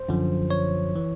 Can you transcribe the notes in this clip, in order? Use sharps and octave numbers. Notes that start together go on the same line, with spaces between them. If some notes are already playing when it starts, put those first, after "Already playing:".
Already playing: C5
F#2 D3 F3
C#5
E3